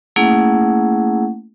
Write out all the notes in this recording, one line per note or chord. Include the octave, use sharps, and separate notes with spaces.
A3 A#3 C#4 E4 G#4 F#5